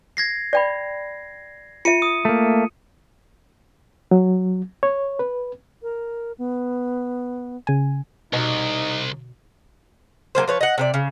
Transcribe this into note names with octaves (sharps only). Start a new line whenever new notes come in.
G#6 A#6 C7
D5 G5 B5
F4 E5 C#7 D#7
D#6
A3 A#3
F#3
C#5
B4
A#4
B3
C#3 G#5
C2 B2 D#4
F#3 G#3 A#3 C5
F3 B4 C#5
D#5 F#5
C3 A#4 D5
C#3